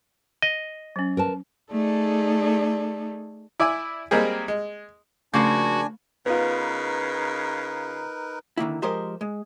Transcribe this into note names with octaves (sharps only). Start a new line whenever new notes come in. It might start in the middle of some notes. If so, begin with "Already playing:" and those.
D#5
F#3 C#4
A#4 B4 A5
A3 D#4 G#4 A4 D5
E4 D5 E5 G#5
G3 G#3 A#3 C4 G#4
G#3
C#3 F3 A3 A#3 D4 F#4 G#5 D6
C#3 B3 D#4 F4 A#4 B4
D3 D#3 A#3 E4
F3 G#3 G4 A#4 C5 D#5
G#3